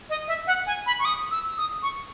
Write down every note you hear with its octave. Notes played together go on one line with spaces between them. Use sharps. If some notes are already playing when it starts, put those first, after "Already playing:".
D#5
E5
F#5
G#5
B5
C#6
D#6
E6
D#6
C#6